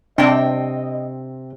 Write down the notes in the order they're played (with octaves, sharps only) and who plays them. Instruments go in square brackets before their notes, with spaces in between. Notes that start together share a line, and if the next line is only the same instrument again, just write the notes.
[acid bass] C3 [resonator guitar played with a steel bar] C4 G5 [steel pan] D4 [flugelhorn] D#5